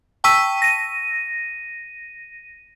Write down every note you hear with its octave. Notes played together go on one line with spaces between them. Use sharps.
G5 A5 C#6 E6 B6 D#7
A#6 D#7